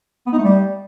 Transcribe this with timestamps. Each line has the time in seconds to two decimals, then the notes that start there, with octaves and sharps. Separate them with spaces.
0.26 B3
0.32 D#4
0.38 A3
0.44 G3